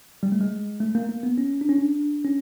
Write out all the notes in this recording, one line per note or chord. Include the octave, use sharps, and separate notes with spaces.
G3
A3
G#3
A3
A#3
A#3
B3
C#4
D4
C#4
D4
C#4